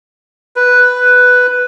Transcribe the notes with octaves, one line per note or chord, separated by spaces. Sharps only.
B4